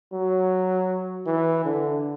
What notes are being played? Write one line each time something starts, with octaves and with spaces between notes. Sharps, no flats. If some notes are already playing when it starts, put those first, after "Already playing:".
F#3
E3
D3